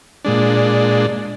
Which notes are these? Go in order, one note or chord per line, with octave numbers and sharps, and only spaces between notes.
A#2 G#3 D4